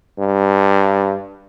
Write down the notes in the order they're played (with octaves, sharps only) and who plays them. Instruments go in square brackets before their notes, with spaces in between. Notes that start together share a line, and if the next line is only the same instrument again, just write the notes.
[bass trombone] G2